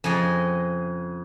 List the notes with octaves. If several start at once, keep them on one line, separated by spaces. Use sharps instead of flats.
F2 C#3 G#4 D#5